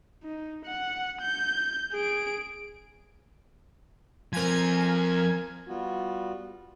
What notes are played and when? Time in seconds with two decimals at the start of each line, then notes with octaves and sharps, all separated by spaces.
0.24 D#4
0.66 F#5
1.22 G6
1.93 G#4 D7
4.33 F3 C4 A#4 G#5 G#6
5.68 G3 B3 F4 F#4